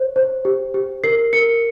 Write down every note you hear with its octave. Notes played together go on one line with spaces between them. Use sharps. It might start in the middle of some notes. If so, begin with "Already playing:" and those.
Already playing: C5 C#5
C5
G4
G4
A#4 C7
A#4 C#7